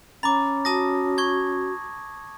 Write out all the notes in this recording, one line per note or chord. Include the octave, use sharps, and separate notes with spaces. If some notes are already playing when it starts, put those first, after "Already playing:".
C#4 A#5 B5 D6 A6
F#4 A5 D#6 A#6
C#6 G#6